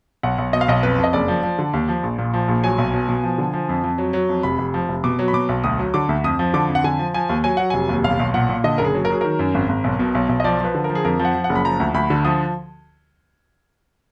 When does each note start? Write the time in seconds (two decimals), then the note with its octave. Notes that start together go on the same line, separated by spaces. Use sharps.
0.23 B1 F#5
0.38 B1
0.53 B2 D#5
0.61 F5
0.68 B1 D#5
0.83 F2 B4
0.98 F2
1.04 D#5
1.13 F#1 D5
1.28 F3
1.43 F3
1.59 D3
1.73 D#2
1.88 F3
2.03 A#1
2.19 A#2
2.34 F3
2.48 A#1
2.63 F#3 G#5
2.78 B1
2.94 B2
3.09 B2
3.23 F3
3.38 D3
3.53 F3
3.69 F2
3.84 F2
3.98 F#3
4.13 F#3
4.29 F2
4.43 F1 B5
4.59 F1
4.74 F3
4.89 F1
5.04 B2 D6
5.19 F#3
5.28 B5
5.33 B2 D6
5.49 B1
5.64 D2 D#6
5.79 F#3
5.94 D3 D6
6.09 D2
6.24 F2 D#6
6.39 F3
6.54 D3 D6
6.69 F2
6.75 F#5
6.84 D3 G#5
6.99 F3
7.14 F3 G#5
7.29 D#2
7.44 F#3 G#5
7.57 F#3 F#5
7.70 F1 G#5
7.89 D#2
8.04 B1 F5
8.20 B1
8.34 A#2 F#5
8.49 A#2
8.64 D3 D#5
8.78 F#1 A#4
8.85 G#4
8.94 F#3
9.05 A#4
9.10 F#3 G#4
9.21 D#3 A#4
9.39 F#2
9.54 G#1
9.69 G#1
9.84 B1
9.99 B2
10.15 B1
10.29 B1
10.40 D#5
10.44 F3 D5
10.60 F3 B4
10.75 D3
10.84 A#4
10.89 F3
10.95 G#4
11.05 F2 A#4
11.19 F3
11.25 F#5
11.34 F3
11.44 F#5
11.49 F#1
11.55 B5
11.64 F3 A#5
11.80 D2
11.94 D2 B5
12.10 D3
12.25 F3 D#6